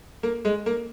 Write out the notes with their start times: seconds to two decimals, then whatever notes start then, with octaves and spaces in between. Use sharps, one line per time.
0.23 A#3
0.45 G#3
0.66 A#3